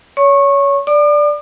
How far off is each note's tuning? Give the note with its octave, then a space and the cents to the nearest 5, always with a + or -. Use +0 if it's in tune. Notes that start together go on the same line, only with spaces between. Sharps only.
C#5 +25 C#6 -20
D5 +0 D6 +45